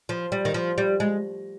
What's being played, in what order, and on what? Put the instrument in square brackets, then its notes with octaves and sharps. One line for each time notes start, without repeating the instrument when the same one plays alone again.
[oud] F3
G3
D#3
F3
G3
G#3